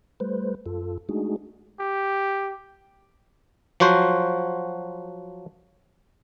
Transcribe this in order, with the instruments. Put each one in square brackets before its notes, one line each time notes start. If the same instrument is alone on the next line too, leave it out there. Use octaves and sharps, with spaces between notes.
[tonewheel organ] G3 A3 B4 C5
F#2 F4 A4
G#3 A3 D4 D#4 F#4 G#4
[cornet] G4
[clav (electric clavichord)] F3 F#3 F#4 C5